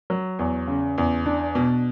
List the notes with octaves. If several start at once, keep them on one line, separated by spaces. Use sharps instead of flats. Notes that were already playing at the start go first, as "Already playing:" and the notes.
F#3
E2
C#3
E2
D4
B2